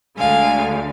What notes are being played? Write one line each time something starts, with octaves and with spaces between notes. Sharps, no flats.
D2 D3 G#3 F5 G#5